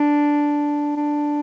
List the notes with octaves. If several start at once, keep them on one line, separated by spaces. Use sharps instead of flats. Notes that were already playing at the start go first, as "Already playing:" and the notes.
Already playing: D4
D4